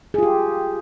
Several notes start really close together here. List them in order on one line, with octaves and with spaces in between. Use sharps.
G#4 F4 G4